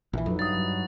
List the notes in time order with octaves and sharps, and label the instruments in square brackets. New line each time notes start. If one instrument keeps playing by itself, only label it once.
[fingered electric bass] A#1 E3 [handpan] E4
[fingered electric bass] F2 [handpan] F#3 D#4 B4
[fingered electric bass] G2 [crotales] D#6 A6
[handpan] F#3